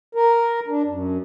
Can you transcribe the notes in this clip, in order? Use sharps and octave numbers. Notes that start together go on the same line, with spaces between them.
A#4
D4
F#2